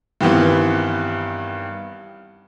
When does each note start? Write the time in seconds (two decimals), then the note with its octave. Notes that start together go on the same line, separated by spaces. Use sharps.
0.21 G2 D#3 E3 B3 C4